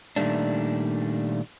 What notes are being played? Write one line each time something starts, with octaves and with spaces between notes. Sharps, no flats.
A#2 D#3 E3 G3 A3 D4